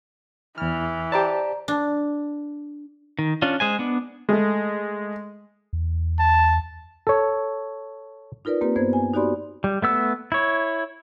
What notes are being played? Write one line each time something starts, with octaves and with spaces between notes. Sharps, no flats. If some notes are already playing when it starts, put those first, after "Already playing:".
E2 E3 F6
G4 C5 D5 A5 A#5 D7
D4
D#3
C#4 D4 F4
G#3 C5 G#5
B3 D4
G#3 A3
E2
A5
A4 C#5
D#4 F4 A#4 B4 D5
A#3 C4 G4 B4
G2 B3 C5 G#6
G#5
D#4 F#4 G4 D5 B5 C6
G3
A3 B3 E6
E4 C#5